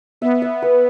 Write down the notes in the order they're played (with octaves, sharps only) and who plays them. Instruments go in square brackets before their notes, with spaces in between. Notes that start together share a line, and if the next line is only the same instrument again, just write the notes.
[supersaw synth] B3 [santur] E5
[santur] E5
B4